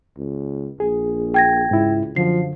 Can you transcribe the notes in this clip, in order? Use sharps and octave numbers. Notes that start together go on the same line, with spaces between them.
C#2
A#1 G#4
G5 G#6 A#6
C#2 G#2 E4
F#2 D3 F3 C7